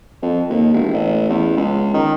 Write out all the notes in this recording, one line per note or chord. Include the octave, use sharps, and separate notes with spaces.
F2
D#2
E1
A1
E2
C#2
D#3